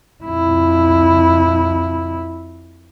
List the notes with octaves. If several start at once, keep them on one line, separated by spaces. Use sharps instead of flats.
F2 E4